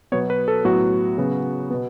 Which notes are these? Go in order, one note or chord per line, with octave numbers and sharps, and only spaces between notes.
B2 F#3 B3 C#5
B4
A4
A2 F#3 B3 F#4
C#3 F#3 B3
B2 B3